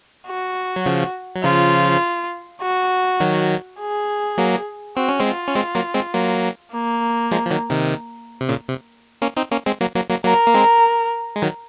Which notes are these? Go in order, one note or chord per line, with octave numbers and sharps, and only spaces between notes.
F#4
F#3
C#3 F3
F#3
C#3 F3 F4
F#4
D#3 F#3
G#4
F#3 A#3
C4 F#4
C#4
G#3 C4
F4
C#4
G#3 C4
F#3 A#3
G#3 C4
F#3 A#3
A#3
F3 G#3
F3
D#3 F#3
C3 D#3
C3
A#2 C#3
C3
A#3 C#4
C4 D#4
A#3 C#4
G#3 C4
F#3 A#3
F#3 A#3
F#3 A#3
F#3 A#3 A#4
A#3
G#3 C4
G#3
D#3 F#3